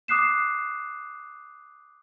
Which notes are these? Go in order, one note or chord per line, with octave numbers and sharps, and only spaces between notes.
D6 D#6 F#6 C7 E7